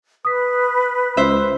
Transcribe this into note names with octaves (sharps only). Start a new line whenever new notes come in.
B4 D#6 B6
C#2 C5 E5